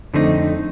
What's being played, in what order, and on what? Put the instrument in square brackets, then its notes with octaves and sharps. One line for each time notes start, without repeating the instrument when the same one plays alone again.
[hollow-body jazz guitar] F2 D3 A3 C4 D#4